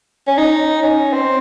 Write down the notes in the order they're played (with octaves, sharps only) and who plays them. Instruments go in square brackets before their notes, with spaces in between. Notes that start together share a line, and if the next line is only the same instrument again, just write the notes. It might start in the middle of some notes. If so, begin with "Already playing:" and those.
[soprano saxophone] C#4
D#4
C#4
C4